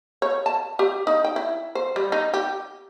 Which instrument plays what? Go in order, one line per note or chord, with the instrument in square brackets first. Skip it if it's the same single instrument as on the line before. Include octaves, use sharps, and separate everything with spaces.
[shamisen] C#5
A5
G4
D#4
G5
E4
C5
G3
D#4
G4